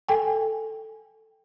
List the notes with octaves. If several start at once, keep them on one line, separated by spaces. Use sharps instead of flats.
A4 G5 G#5